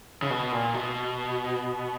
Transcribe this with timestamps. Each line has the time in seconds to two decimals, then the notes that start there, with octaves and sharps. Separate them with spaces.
0.22 C#3
0.30 B2
0.52 A#2
0.74 B2